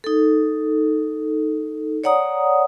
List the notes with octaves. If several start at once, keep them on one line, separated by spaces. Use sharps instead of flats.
D#4 A4
C#5 D5 F#5 A#5 D#6